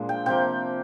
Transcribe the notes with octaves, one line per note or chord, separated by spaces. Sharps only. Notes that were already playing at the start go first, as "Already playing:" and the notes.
Already playing: A#2 F3 G#3 D4
G5
C3 F3 A#3 G5